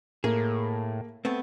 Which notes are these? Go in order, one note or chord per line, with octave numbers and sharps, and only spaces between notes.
A2 A#3 G#4
A3 B3 C4